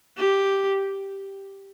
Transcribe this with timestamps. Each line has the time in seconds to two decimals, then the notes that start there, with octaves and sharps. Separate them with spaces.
0.17 G4